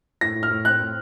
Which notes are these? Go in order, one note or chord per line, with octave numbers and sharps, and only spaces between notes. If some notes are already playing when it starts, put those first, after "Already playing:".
A2 A#6
A2
F6
A2
C4 F#6
A2